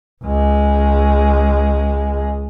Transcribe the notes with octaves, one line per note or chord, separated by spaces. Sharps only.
C#2 G#3